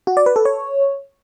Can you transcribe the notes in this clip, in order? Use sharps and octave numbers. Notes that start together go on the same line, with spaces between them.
F#4
D5
B4
A4
C#5